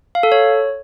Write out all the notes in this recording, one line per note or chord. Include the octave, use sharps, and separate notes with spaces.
F5
A4
C#5